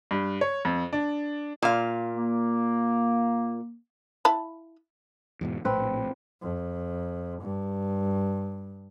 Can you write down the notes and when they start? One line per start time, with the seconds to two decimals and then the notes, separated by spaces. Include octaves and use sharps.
0.11 G2
0.41 C#5
0.65 F2
0.93 D4
1.62 A#2 F5
2.14 A#3
4.25 E4 A5 B5
5.41 E2 G#2 B2
5.65 A#1 A2 C4 B4
6.42 F2
7.41 G2